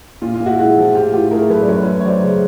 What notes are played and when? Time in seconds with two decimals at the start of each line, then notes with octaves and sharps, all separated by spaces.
0.22 A#2 F4
0.34 F4
0.40 A#2
0.46 E4 F#4
0.58 G#3 E4 F#4
0.77 F3
0.95 A2 F4 G4
1.13 A2 F4 G4
1.31 A3 G#4 A#4
1.49 F#3 A4 B4
1.62 D5
1.68 F#2 B4 C#5
1.86 A3
2.01 C#5
2.05 F#3 C5 D5
2.22 C#3